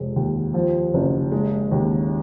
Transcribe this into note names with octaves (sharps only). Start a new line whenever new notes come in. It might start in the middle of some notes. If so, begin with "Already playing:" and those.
Already playing: F1 G#3
D#2
F3
F#1
G#3
D#2